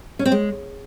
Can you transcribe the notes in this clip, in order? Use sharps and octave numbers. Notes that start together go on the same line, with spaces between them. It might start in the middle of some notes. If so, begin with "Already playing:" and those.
C#4
C4
G#3